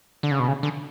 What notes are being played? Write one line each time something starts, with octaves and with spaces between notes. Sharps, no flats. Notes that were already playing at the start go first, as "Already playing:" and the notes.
D3
C#3
B2
C#3
D3